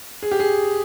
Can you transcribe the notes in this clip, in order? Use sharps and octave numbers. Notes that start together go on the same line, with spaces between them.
G#4
G4
G#4